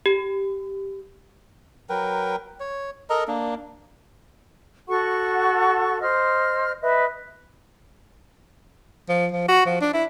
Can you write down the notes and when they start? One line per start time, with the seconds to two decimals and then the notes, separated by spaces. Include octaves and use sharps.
0.06 G4
1.89 F#3 A#4 B4 G5
2.60 C#5
3.10 A4 A#4 D#5 A#5
3.28 A#3 D4
4.88 F#4 A4 F#5 C#6
6.00 C5 D#5 F6
6.81 B4 D#5 E5
9.09 F3
9.32 F3
9.48 F#4
9.66 F3
9.81 D4
9.94 E4